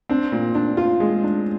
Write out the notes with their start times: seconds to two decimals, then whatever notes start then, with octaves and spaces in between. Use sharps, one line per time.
0.09 C4 D4
0.32 A#2
0.55 D4
0.77 F4
1.00 G#3
1.23 D4